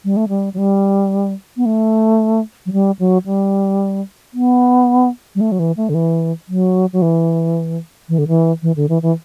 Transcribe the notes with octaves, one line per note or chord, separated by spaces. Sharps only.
G3
A3
G3
F#3
G3
B3
A3
F#3
G3
F#3
G3
B3
G3
A3
F#3
E3
A3
D3
E3
F#3
F#3
E3
E3
D3
E3
E3
D3
E3
E3